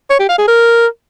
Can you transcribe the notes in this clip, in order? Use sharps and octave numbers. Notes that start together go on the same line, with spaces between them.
C#5
G4
F5
G#4
A#4